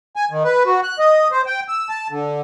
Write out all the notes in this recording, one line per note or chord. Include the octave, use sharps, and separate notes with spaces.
G#5
D#3
B4
F#4
F#6
D#5
C5
G5
E6
A5
D3